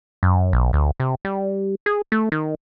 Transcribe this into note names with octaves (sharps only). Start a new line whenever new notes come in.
F#2
B1
D2
C3
G3
G#4
A3
D#3